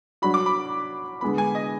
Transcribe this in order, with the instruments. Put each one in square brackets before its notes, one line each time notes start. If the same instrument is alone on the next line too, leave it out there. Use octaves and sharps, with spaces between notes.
[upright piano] F#3 D4 F#4 [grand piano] B5
[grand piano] D6
B5
[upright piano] D3 G#3 B3 [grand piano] B5
[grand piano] G#5
D#5